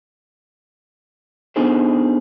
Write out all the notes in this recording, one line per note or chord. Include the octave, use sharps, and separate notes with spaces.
B3 D4 D#4 G#4 A4 C5